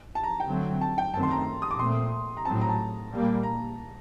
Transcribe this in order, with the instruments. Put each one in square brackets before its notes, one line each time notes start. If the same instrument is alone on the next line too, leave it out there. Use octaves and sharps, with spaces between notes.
[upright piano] A5
A#5
G5
[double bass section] D3 F#3 A3 C4
[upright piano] A5
G5
[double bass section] F#2 D#3 A3 C4 [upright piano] A5
[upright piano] C6
A#5
D#6
D6
[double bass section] A#2 A3 C4 [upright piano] C6
[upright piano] A#5
[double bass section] A2 F#3 C4 [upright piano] A5
[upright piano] A#5
A5
[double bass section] A#2 G3 A#3
[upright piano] A#5